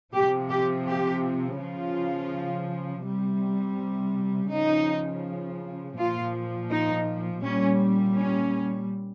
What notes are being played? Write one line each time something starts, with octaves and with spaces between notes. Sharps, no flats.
C3 F3 G4
G4
G4
C#3 F3 F4
C3 G3
C#3 F3 D#4
A#2 F3 F4
D#4
A#2 G3 C#4
C#4